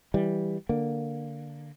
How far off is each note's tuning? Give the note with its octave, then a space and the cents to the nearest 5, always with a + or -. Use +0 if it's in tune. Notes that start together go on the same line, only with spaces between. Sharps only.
E3 +0 G3 +0
D3 +5 A#3 +0